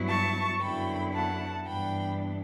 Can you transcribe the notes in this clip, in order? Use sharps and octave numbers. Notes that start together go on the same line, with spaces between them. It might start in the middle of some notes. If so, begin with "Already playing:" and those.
Already playing: G2 F#3 B3 E4
A5 C#6
F#2 D3 F#3 B3 E4 G5 B5
F#5 A5
G2 E3 B3 D4 G5 B5